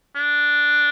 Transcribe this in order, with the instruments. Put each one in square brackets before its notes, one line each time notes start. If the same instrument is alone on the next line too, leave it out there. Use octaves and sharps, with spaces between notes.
[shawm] D4